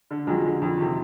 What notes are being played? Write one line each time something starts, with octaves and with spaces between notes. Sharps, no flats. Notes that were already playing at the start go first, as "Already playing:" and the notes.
D3
F2 F#3 G#3
D3
F2
C3 D#3